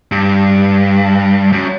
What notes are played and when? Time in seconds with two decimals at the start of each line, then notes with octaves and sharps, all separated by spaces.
0.12 G2
1.53 F#2